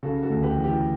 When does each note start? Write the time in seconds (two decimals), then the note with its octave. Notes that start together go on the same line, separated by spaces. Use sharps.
0.03 C#3 F#4 A4
0.23 F#4 A4
0.30 D2
0.43 G4 B4
0.57 E3
0.64 G4 B4